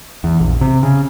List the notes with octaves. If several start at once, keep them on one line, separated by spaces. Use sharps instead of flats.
E2
A#1
C3
C#3